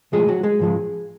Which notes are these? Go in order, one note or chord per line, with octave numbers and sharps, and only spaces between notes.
B1 A2 F3 G#3 G#4
F#3 F#4
G#3 G#4
G#2 F3 G#3